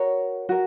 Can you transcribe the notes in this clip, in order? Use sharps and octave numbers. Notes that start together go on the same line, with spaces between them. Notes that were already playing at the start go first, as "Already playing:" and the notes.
Already playing: F#4 A#4 C#5
F#4 A#4